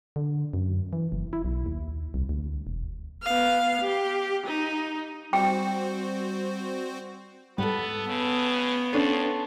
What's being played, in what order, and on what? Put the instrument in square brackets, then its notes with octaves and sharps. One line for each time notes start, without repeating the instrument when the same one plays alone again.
[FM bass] D3
F#2
E3
F#1
E4
B1
D#2
C2
D2
E1
[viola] B3 F5
G4
D#4
[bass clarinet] G3 [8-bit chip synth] C4 F#4 C5 [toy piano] G5
[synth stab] G#2 G3 [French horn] B3 [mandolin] A4 B4
[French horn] C#3 [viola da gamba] B3
[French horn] F2 [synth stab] C#4 D4 B4 [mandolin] A4 C#5 C6